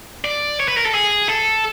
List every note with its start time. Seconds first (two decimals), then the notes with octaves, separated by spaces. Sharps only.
0.25 D5
0.60 C#5
0.68 B4
0.77 A#4
0.85 A4
0.94 G#4
1.29 A4